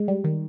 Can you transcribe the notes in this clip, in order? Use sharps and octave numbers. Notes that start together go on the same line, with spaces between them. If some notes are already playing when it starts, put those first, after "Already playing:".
Already playing: G#3
G3
D#3